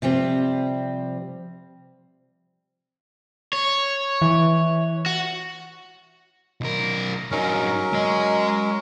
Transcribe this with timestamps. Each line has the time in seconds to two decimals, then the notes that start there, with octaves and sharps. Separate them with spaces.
0.02 C3 F3 G3 C4
3.53 C#5
4.21 E3
5.06 F#4
6.61 B1 A#4
7.31 G2 F#3 C#4 D#4 A#4
7.93 G#3 D#5